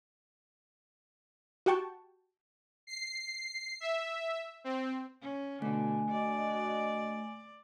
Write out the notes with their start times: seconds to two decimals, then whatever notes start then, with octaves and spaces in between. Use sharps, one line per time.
1.66 F#4 G4 F#5 G5 A5 C#6
2.87 C7
3.80 E5
4.64 C4
5.21 C#4
5.62 B2 D3 A3 G#5
6.10 D4 F#4 D5 D#5